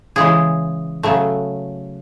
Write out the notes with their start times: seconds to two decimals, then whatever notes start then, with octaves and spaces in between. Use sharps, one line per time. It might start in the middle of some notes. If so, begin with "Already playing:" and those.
0.16 C#3 E3 G#3 G#4
1.03 C#3 F#3 A3